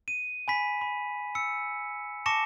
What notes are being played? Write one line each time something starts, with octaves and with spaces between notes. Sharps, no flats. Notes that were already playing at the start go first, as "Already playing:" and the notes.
D#7
G#5 B5 B6
B5
E6 C#7
A5 C#6 D6 A#6 C#7 E7